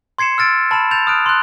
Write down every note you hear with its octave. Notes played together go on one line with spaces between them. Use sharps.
C6 G#6 C7 C#7 E7
E6 F6 A6 D7
A5 B5 F6 E7
G6 A6 E7 F7
D#6 F6 F#6 D7
C6 F#6